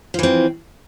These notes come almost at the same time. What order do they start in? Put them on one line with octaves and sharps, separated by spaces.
F3 E3 C4